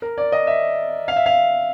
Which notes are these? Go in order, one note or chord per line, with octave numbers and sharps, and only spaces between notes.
A#4
D5
D#5
E5
F5
E5
F5